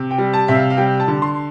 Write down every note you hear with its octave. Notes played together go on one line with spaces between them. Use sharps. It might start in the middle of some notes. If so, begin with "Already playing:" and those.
Already playing: C3
G5
G3
A5
C3 E5
F5
F5
G3 G5
A5
D3
C6